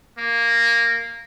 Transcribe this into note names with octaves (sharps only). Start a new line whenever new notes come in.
A#3